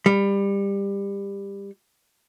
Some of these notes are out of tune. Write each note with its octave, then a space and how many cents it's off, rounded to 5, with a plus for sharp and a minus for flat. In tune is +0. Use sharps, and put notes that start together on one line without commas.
G3 +20